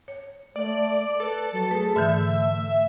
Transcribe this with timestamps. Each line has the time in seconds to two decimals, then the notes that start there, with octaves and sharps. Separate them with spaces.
0.08 C#5
0.56 A3 D5
1.20 A4 B4
1.52 F#3
1.71 A3 G#4 B4
1.96 G#2 D3 E3 A3 E5